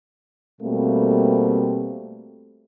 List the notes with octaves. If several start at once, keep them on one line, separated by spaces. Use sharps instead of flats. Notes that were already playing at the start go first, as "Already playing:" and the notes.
B2 G3 A3 A#3 C4